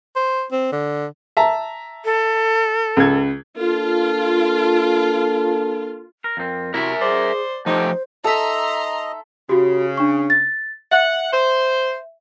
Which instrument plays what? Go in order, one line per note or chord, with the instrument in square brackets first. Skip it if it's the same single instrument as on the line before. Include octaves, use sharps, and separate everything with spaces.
[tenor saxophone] C5
C4
D3
[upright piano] E5 A5 A#5
[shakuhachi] A4
[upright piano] C#2 G#6
[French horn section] A#3 D4 A4 [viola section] F4
[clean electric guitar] A#4
[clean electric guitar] F2 C4 [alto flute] A#4
[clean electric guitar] C3 [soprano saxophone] E4 [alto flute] F#4 [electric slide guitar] A#4 E5
[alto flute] G#4 [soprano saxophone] C5 [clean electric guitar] D5
[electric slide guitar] F3 A3 G4 [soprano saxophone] D#4 [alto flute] C5
[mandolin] D#4 E5 [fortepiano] A4 [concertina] D#5 [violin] A#5 C6
[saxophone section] C#3 [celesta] F#4 G4
[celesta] D4 C#6
A6
[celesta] E5 [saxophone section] F#5
[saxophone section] C5